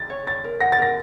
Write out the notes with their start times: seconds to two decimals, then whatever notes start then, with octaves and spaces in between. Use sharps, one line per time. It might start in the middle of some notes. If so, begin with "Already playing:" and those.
Already playing: A6
0.10 C#5
0.27 C#5 A6
0.44 A#4
0.61 F#5 A#6
0.72 A6
0.78 A#4 A#6